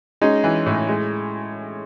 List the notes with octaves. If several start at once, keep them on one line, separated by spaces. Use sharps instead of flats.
G#3 C#4 D#4
E3
A2
G#3